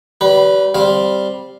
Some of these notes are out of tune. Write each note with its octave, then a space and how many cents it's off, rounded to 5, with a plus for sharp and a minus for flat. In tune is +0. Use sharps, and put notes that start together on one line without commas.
G3 -35 B4 +0
G3 +0 C4 +0 F5 +0